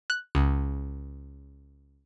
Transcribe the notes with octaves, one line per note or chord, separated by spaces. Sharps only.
F#6
C#2